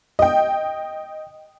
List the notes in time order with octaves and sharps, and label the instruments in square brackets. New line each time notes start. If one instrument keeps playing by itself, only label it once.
[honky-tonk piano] D#5 G5